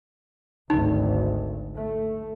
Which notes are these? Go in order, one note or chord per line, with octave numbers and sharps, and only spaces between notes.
G#1 D2 D#4
A3